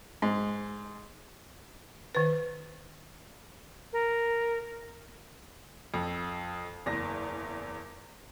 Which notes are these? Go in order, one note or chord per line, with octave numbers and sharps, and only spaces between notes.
G#2
D#3 B4
A#4
F2
F#1 E2 A#6